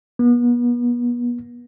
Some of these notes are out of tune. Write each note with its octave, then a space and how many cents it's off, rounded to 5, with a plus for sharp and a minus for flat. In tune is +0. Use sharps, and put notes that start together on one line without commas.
B3 -35